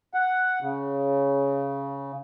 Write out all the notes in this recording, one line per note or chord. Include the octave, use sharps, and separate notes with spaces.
F#5
C#3